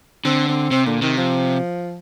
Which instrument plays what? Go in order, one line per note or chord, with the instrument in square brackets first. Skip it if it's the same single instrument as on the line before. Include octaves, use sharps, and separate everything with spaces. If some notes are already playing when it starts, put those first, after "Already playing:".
[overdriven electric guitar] D3 [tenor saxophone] C4
[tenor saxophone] C4
[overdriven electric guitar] C3 [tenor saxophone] C4
[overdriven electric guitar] A#2 [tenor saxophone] D3
[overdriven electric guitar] C3 [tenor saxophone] D#3
[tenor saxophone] F3